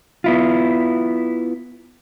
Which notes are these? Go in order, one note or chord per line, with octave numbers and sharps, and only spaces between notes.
B3 E4 F4